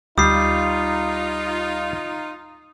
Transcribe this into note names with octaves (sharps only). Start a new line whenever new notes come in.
D2 G3 D#4 F4 D#6 C7